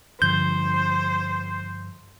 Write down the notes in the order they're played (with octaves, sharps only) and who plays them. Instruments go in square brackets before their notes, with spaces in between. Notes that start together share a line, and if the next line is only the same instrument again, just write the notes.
[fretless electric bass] G2 D3 F3 [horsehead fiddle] C5 [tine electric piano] G6